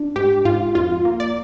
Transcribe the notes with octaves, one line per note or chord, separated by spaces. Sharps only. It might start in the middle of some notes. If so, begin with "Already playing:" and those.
Already playing: D4
G#2 G4
G#2 F4
F2 F4
A#3
D5